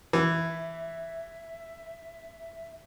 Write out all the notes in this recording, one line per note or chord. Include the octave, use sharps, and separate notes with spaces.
E3 E5